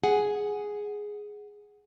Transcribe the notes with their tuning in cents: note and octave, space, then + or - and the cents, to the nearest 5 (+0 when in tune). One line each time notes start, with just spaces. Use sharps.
G#4 +0 F#5 +0